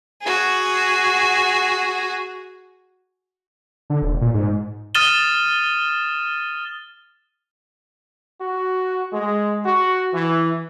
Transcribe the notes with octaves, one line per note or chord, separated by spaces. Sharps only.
F#4 G#4
D3
D#1
A#2
G#2
D#6 F6 A6 D#7 E7 G7
F#4
G#3
F#4
E3